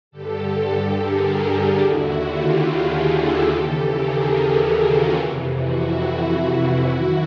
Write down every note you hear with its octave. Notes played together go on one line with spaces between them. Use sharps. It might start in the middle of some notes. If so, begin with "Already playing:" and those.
G2 D3 G4 A4
G#4 A#4
G4 A4
D#2 D3 E4 F#4
F4 G4
F#4 G#4
G4 A4
D#2 C#3 E3 G4 A4
G#4 A#4
G4 A4
F#4 G#4
F4 G4
F2 C3 E3
E4 F#4
E4 F#4
F#2 D#3